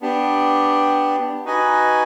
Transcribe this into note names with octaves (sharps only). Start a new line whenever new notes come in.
B3 D4 G4
D#4 F#4 B4 D#5 G#5